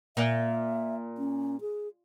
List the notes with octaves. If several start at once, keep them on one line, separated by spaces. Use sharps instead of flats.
A#2 E5
C#4
G#4